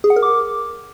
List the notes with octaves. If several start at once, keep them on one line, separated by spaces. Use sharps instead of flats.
G#4
F#5
A#4
D6